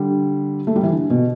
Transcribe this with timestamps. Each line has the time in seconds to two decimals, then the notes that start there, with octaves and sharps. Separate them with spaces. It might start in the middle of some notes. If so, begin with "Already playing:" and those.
Already playing: D3 G3
0.67 A3
0.76 G3
0.83 E3
0.92 D3
1.10 B2